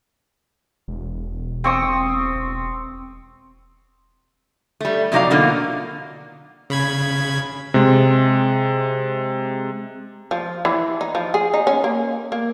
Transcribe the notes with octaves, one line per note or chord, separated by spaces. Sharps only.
E1
C4 C#6 D#6
E1
G3 A3
F2 C3 F#3 D#4 D5 F5
B2 D3 A#3 F4
C#3 B5 G#6
C3 G#3
F3
E3
D#4
F3
G#4
D#4
C#4
A#3
A#3